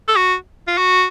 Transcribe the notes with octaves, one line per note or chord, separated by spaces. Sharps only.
A4
F#4
F4
F#4